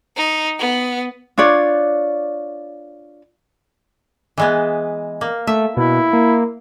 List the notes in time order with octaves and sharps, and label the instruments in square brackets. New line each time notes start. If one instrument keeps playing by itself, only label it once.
[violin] D#4
B3
[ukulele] D4 F4 C#5 D5
[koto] E3 G#3 B3
A#3
[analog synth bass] A3 [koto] E5
[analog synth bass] B2 [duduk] E4
[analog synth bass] A#3